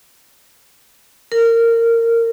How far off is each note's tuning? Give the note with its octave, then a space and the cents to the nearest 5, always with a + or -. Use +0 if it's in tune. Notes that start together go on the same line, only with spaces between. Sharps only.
A#4 -20